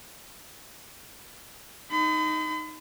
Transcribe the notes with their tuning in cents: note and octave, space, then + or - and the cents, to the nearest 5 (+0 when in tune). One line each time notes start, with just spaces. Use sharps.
D#4 +0 B5 +45